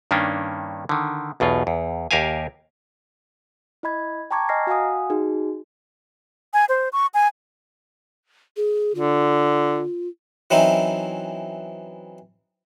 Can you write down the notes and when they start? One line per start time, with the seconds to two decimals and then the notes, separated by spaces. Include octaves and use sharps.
0.11 G2 D#3 A#3 C#4 D4
0.89 D3 D#3
1.40 B1 E2 B2 F4
1.67 E2
2.11 D#2 G4 A#4 E5 F5 G#5
3.83 E4 D#5 B5 G#6
4.31 G5 A5 A#5 C#6 D6 G#6
4.49 D#5 G#5 A#5 F6 A#6 C7
4.67 F#4 F5 F#5 G#5 D#6
5.10 D#4 F#4 G#4
6.54 G#5
6.69 C5
6.93 C#6
7.14 G#5
8.57 G#4
8.95 D3 F4
10.51 E3 F#3 C4 C#4 D#4 E4